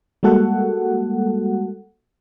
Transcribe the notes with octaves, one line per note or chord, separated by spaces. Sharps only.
G3 G#3 A#3 F#4 A4 F#5